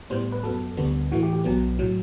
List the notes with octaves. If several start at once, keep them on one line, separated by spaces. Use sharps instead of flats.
A2 G3 B3 C5
B4
F#2 F#3 B3 A4
D2 D3 G3 B3
A2 E3 A3 F#4
G4
G4
B1 B2 F#3 B3
A2 F#3